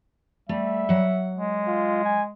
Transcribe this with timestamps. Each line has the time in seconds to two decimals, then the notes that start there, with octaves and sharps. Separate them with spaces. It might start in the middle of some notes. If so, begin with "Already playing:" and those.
0.49 G3 A3 E5
0.89 F#3 F#5
1.34 G#3
1.67 F4
2.04 G#5